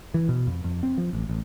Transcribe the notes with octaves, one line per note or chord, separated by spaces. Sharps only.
E3
B2
F2
F2
C4
F3
A1
A1